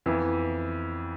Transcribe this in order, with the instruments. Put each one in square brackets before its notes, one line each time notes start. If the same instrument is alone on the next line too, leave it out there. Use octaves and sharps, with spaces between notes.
[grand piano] F2 E3 B3 E4